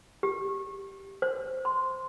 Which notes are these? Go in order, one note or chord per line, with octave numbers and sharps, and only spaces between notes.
G4
C5
C6